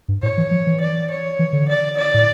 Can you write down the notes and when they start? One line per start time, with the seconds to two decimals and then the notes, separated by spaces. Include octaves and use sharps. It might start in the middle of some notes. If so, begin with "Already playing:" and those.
0.08 G2
0.23 A2 C#5
0.38 E3
0.51 F3
0.67 E3
0.80 D5
1.10 C#5
1.39 E3
1.53 D3
1.68 D5
1.97 D5
2.14 A2